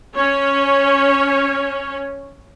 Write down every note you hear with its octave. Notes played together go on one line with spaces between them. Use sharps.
C#4 C#5